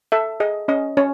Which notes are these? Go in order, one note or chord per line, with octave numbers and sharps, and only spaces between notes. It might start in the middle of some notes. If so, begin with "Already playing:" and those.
A4 E5
G#4 D#5
C#4 D#5
C#4 C#5